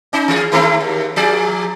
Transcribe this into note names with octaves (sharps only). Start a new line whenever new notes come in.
C#4 D#4
E3 G#4
D#3 A3 C4
D#2
F3 G#4 D5